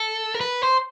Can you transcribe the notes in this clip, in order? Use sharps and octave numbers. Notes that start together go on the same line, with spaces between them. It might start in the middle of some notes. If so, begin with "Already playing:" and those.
Already playing: A4
A#4
B4
C5